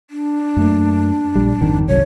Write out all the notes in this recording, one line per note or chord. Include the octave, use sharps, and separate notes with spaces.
D4
F#2 A3 A#3
A#1 G3
G#1 F2 D#3
F#1 C2 F#2 C#5